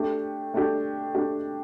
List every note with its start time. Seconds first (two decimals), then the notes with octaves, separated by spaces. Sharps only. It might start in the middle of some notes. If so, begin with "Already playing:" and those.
Already playing: A3 D4 G4
0.54 A3 D4 G4
1.15 A3 D4 G4